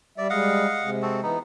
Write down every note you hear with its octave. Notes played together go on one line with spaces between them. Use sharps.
G3 D5 E5
G3 G#3 D#5 F5 F#5
C3 G#3
C4 F#4 A4
E3 B3 D#4